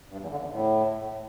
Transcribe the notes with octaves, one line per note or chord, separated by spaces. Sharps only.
G2
E2
D3
E2
A2